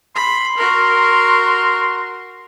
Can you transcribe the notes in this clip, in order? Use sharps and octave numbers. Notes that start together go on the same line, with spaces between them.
B5 C6
F#4 A#4